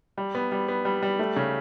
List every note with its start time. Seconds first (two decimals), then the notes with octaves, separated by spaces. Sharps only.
0.18 G3
0.35 B3
0.52 G3
0.68 B3
0.85 G3
1.02 G3
1.19 A3
1.36 C#3